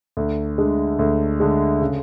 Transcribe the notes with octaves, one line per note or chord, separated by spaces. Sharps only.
D2
D3 G#3
D2
D3 G#3
C#3